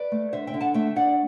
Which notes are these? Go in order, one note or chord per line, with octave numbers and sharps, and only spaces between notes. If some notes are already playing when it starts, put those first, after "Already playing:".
Already playing: B4 D5
A3
D3 C5 E5
E5 G5
D3
F#5 A5
A3 E5 G5
D4 D5 F#5